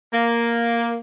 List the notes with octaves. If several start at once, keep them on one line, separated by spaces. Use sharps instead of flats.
A#3